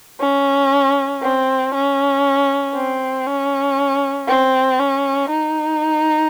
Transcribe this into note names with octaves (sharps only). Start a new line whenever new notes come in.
C#4
C4
C#4
C4
C#4
C4
C#4
D#4